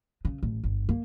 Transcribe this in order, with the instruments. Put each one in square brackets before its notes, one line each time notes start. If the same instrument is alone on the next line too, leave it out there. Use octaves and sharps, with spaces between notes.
[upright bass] C#3
A1
G1
A#3